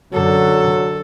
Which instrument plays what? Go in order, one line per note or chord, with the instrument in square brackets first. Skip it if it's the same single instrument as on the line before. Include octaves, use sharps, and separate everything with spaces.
[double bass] F#2 D3 [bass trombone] F#3 [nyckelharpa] A4